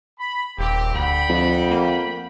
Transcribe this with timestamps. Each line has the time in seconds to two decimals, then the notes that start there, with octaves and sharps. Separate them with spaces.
0.18 B5
0.58 D#1 A#3 C4 G4
0.95 D2 F#5 G5 B5
1.29 F2
1.71 A#3